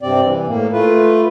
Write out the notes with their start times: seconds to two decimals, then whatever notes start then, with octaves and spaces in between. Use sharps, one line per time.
0.01 G2 C3 C4 D5
0.26 E3
0.48 A2 A#3
0.73 A3 F4 B4